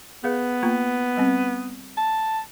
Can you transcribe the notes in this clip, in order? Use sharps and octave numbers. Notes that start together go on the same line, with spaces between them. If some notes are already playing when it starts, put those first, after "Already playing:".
B3 G#4 B4 F5
A#3 F4 A#5
G3 C4
A5